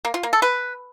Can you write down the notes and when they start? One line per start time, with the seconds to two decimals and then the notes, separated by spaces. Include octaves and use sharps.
0.05 A#3
0.14 F4
0.23 A#3
0.33 A4
0.42 B4